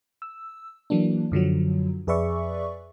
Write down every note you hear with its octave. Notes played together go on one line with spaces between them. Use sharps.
E6
E3 F#3 A#3 D4
F#2 D3 F3 F#3
F2 G#4 B4 D5 E5 C#6